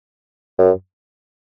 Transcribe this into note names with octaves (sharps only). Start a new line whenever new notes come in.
F#2